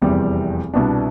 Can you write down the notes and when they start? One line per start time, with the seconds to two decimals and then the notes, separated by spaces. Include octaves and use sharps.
0.02 F1 E2 C3 G3
0.74 C2 B2 B3 D4